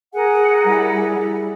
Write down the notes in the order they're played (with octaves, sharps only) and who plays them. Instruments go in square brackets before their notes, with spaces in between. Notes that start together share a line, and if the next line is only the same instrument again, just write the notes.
[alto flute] G#4 [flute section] A#4 F#5 G#5
[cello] G3 E4